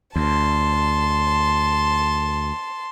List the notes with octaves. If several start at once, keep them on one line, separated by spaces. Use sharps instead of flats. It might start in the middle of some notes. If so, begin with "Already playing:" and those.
D2 A5 C6